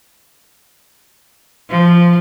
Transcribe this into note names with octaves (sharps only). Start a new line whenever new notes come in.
F3